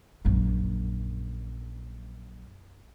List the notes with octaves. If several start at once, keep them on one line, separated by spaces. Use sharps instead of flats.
A#1 F#2